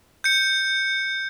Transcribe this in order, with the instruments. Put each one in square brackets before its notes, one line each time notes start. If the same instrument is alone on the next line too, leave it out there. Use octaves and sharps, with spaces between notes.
[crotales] G6 C#7